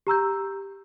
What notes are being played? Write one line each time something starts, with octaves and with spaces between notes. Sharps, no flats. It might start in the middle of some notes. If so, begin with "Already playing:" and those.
G4 A#5 E6 G6